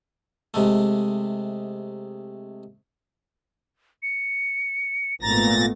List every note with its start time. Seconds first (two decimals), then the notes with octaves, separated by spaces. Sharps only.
0.54 C3 G#3 A3
4.02 C#7
5.22 G#1 A#2 A3 B3 A#5 A6 A#6